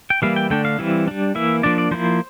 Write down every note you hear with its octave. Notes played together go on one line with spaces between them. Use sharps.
G5
E3 G3 A#3 E4 F5
G5
D3 A3 D4 G5
F5
E3 G3 C4 E4
G3 D4
E3 A#3 E4 E5
F3 A#3 D4 D5
D5
F3 A#3 E4 C5